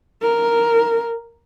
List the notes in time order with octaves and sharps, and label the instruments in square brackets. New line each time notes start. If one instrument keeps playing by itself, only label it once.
[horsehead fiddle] A#4